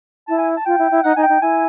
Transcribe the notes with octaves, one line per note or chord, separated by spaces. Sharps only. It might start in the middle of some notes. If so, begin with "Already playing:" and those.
E4 A5
G#5
A5
F4 G5
E4
E4
D#4 F#5
D#4 G#5
G5
D#4
E4 G#5